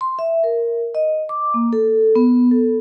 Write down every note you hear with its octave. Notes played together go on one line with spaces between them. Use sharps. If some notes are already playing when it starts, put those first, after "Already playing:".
C6
E5
A#4
D#5
D6
A#3
A4
B3
A4